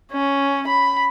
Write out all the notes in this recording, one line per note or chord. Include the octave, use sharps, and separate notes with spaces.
C#4
B5